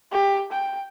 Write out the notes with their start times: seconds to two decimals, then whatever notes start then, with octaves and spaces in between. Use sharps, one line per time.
0.12 G4
0.52 G5